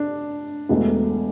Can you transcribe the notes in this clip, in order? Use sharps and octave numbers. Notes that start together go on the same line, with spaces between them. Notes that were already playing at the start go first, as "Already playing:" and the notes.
Already playing: D4
E1 E2 B2 A3